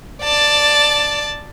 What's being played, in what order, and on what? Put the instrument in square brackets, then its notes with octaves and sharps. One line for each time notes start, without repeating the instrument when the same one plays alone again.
[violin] D5 A5